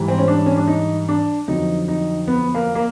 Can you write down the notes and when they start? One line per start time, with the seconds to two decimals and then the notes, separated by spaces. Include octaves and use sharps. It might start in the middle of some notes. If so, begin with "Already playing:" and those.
Already playing: G#2 E3 G3
0.08 C4
0.18 C#4
0.28 D4
0.46 C#4
0.57 D4
0.68 D#4
1.09 D4
1.48 F2 D3 F#3 D#4
1.88 D#4
2.27 B3
2.55 A#3
2.75 A#3